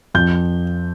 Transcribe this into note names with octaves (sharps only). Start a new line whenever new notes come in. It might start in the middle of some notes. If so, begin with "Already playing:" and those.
F2 G6